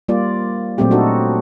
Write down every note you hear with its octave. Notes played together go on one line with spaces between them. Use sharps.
G3 A#3 F4 D5
A#2 F#3 A3 C4 G4
D4 D#4 F#4 A4